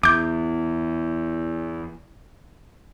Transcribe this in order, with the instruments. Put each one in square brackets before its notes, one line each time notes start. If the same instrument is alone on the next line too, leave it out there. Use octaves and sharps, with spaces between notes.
[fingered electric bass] E2 [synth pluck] D6 G6